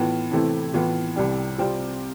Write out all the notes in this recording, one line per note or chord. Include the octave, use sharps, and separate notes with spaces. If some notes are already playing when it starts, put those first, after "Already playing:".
Already playing: A2 E3 B3 F4
C3 E3 A3 C4 E4
A2 E3 B3 F4
C2 C3 G3
C3 G3 C4 F4